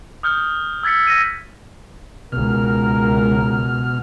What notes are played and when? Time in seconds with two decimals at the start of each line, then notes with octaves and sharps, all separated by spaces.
0.23 D#6 F6 G6 G7
0.83 E6 G#6 A6 B6 C#7
1.07 E6 A#6 B6 D#7
2.32 C#2 B2 A#4 F6